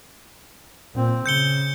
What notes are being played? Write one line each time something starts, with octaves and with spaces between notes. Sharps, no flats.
A#2 C4
C#3 G6 C#7 G7